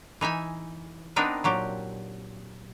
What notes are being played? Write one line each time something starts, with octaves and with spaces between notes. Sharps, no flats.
E3 D#4 E5 G#5
B3 C4 D4 D#4 A#4 B4
A#2 F#3 G4